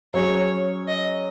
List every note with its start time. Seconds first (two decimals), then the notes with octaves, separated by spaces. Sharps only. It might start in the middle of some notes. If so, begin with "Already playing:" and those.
0.14 F#3 C#4 G#4 C#5
0.88 D#5